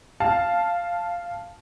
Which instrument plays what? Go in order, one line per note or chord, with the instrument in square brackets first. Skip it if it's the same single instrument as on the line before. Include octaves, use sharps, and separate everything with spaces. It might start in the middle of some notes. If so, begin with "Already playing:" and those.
[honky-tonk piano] F5 A5